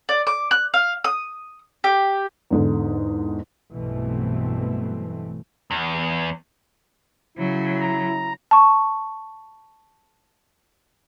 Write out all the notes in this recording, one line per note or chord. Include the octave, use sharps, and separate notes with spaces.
D5
D6
F#6
F5
D#6
G4
E2 G#2 D3
B1 G2 B2 E3 A3 C4
E2
C#3 F#3 E4
A#5
A5 C#6